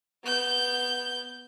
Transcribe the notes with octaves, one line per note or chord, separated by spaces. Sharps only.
B3 G6